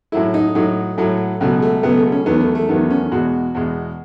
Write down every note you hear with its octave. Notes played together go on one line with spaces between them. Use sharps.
A2 F#3 A3 E4
D#4
A2 F#3 A3 D#4
A2 F#3 A3
C#2 B2 F#3 A3
A3
C#2 B2 F#3 A3 B3
A3
C#4
E2 D#3 F#3 A3 B3
A3
A3
E2 D#3 F#3 A3 B3
C#4
E2 B2 G#3 F#4
E2 B2 G#3